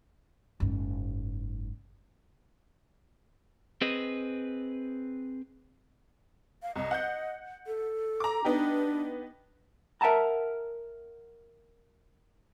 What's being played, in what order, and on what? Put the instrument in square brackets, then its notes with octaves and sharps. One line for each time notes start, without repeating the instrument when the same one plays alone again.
[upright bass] F#1 G#2
[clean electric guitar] C4 G#4 B4 D#5
[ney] F5
[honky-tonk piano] C2 [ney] D#5
[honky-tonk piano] F#5 F#6 G6
[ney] A4
[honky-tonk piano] A#5 D6
[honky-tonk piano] B3 D#4 G4 [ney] D4
[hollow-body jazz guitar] A#4 E5 F#5 A5 A#5